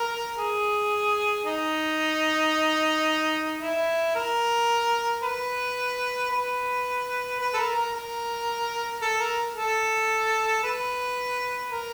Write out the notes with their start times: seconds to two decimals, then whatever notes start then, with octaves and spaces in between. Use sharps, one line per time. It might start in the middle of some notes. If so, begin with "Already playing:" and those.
Already playing: A#4
0.37 G#4
1.45 D#4
3.62 E4
4.15 A#4
5.23 B4
6.31 B4
7.40 B4
7.54 A4
7.58 A#4
7.75 A#4
7.93 A#4
9.02 A4
9.20 A#4
9.55 A4
10.64 B4
11.72 A#4